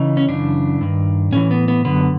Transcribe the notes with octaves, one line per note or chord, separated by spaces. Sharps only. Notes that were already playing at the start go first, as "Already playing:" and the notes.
Already playing: C#3 E3 D#4
C#4
F#2 C#3 E3 D4
G2 D#3
A2 E3 C#4
B3
B3
F#2 D3 B3